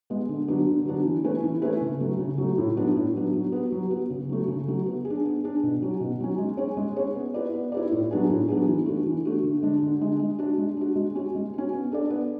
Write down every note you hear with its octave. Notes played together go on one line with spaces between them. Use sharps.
G#3 B3
D3
F#3 B3 D4
D3
F#3 B3 D4
E3
A3 C#4 E4 B4
E3
A3 C#4 E4 B4
C#3
F#3 A3
C#3
F#3 A3
A2
F#3 B3 D4
A2
F#3 B3 D4
F#3
B3 F#4
F#3
B3 F#4
C#3
F#3 A3
C#3
F#3 A3
B3
G#4
D4
B3
D4 G#4
B2
F#3 C#4
B2
F#3 C#4
G#3
C#4 G#4 C#5
G#3
C#4 G#4 C#5
B3
E4 B4 D5
B3
E4 B4 D5
A2
F#3 B3 D4 G#4
A2
F#3 B3 D4 G#4
E3
A3 D4 F#4
E3
A3 D4 F#4
D3
G#3 D4
D3
G#3 D4
G#3
D4 F#4
G#3
D4 F#4
G#3
C#4 F#4
G#3
C#4 F#4
B3
D4 A4 D5
B3